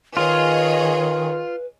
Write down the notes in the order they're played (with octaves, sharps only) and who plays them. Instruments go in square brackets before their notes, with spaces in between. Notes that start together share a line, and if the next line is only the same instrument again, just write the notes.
[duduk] D#3 [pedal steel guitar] F4 [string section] G#4 C#5 D#5 [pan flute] B4